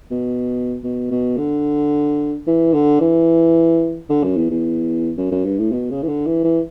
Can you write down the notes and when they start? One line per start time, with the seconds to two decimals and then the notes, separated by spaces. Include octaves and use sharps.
0.11 B2
0.84 B2
1.11 B2
1.37 D3
2.47 E3
2.74 D3
3.01 E3
4.09 D3
4.23 F#2
4.37 E2
4.51 E2
5.17 F#2
5.31 F#2
5.45 G2
5.59 A2
5.72 B2
5.91 C#3
6.03 E3
6.08 D3
6.27 E3
6.44 E3